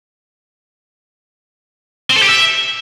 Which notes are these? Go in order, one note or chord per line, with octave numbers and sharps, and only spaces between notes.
C4
A4
G4
E5